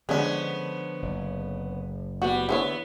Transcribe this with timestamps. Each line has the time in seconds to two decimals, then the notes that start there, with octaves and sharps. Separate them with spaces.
0.09 D3 F3 G#3 B3 C#4 D4
1.02 F#1
2.22 G3 B3 F#4
2.49 D3 E3 B3 C#5